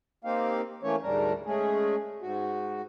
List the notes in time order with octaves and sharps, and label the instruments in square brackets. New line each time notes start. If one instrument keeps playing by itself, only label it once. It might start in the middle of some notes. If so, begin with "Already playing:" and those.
[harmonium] A#3 C4 D#4 G4 F5
E3 A3 A#3 C#4 C#5
D2 G#2 G3 D4 A#4
G#3 A3 C#4 G#4
G#2 F#4